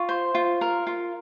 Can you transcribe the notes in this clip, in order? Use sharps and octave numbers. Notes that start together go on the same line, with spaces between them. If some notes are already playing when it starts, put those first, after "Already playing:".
Already playing: F4 C#6
C5
F4
A#4
F4